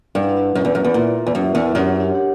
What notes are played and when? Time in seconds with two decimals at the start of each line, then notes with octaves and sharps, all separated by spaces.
0.15 G2 E4 B4 F#5
0.55 F#2 E4 B4 F#5
0.65 E2
0.75 F#2
0.85 E2
0.94 A#2 E4 A#4 E5
1.27 E2
1.35 F#2 E4 A#4 E5
1.55 E2
1.74 F#2 D4 G4 C#5 F#5
2.14 D4 G4 C#5 F#5